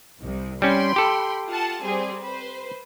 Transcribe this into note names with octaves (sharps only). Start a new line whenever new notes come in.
C2
G3 C#4 G5 B5 C6
G4 A4
F4 F#5 A5
G3 C4 G#4
B4 C5